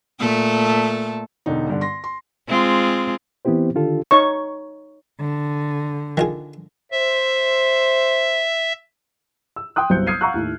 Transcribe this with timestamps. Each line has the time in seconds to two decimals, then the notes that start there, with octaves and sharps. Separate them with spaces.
0.20 A#2 A3 A4
1.46 E1 D3 D#4
1.69 G2 D3
1.81 C6 A#6
2.04 C6
2.49 G#3 C4 F4
3.45 E3 B3 C4 E4 G4 C5
3.75 D3 D#3 D4 F4 G4 A4
4.11 D#4 C#5 C#6
5.20 D3
6.17 D#3 F4 G#4
6.92 C5 E5
9.56 E6
9.76 G5 C6 D#6 F#6
9.90 G1 C2 F#3 C5 G6 C#7
10.07 D#6 F6 G#6 C7 C#7 D#7
10.21 F5 F#5 A#5 C#6 E6 F#6
10.34 D#2 A2